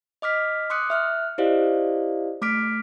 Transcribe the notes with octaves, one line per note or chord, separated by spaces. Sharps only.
D#5 D6 F6 B6
C6 D6 D#6 F#6 C#7
E5 F6 F#6
E4 G4 C5 D5 D#5 F5
A3 D6 F6 B6 D7